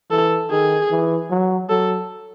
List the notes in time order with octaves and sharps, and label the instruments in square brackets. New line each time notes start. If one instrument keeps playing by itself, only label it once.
[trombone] E3 [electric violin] A4
[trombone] D#3 [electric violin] G#4
[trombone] E3
F#3
[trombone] F#3 [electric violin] A4